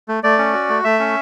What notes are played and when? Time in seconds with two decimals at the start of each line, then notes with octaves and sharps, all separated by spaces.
0.09 A3
0.24 A3 D5
0.39 C#4
0.54 F#4
0.69 A3
0.84 A3 E5
1.00 C#4